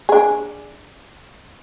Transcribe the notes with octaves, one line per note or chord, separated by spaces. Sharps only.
D4 G#4